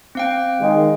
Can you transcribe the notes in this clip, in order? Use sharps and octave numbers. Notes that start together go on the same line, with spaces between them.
C4 F5 G5
D#3 G#3